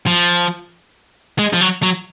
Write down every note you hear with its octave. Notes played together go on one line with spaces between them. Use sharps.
F3
G#3
F3
F#3
F#3